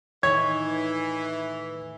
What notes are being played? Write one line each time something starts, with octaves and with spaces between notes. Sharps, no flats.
A2 D#3 E3 D#4 C#5 G#6